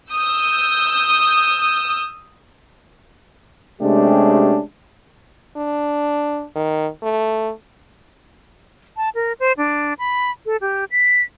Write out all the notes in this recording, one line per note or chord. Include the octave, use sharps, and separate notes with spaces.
D#6 E6 G6
C3 G#3 A3 C#4 D4 G4
D4
D#3
A3
A5
A#4
C5
D4
B5
A4
G4
B6